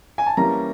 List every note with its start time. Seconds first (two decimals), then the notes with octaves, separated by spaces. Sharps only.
0.18 G#5
0.26 A5
0.37 E3 G3 A#3 C#4 A#5